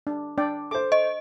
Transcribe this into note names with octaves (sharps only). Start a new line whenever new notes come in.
D4
D4 D5 G5
A4 C5 D6
D#5